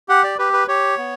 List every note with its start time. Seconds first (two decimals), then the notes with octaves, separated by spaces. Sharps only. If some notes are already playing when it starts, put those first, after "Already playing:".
0.09 G4 F#5
0.24 D5
0.38 G4 B4
0.53 B4
0.68 G4 C#5
0.98 B3